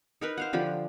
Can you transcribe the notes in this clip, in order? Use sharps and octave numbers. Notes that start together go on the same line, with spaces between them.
D#4 A#4 B4
C5 F5 F#5
D3 F3 G4 B5